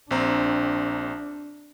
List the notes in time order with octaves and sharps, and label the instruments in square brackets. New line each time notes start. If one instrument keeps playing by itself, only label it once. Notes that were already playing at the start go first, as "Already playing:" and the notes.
[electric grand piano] A#1 C4 A#5 [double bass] D4